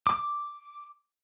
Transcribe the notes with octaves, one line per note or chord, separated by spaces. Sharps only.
D6